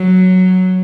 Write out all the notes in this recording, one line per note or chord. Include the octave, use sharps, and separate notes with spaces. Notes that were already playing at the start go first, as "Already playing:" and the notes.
Already playing: F#3